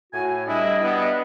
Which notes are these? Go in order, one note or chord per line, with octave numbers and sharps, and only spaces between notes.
A2 F#4 G#5
G3 D4 E4 D#5
B3